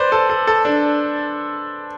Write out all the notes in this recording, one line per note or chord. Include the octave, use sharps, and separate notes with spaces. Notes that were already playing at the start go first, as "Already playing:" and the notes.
Already playing: B4 C5 D5
A4
A4
A4
D4